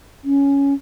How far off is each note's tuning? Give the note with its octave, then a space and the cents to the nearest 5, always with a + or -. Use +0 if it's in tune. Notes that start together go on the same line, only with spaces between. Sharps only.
C#4 +10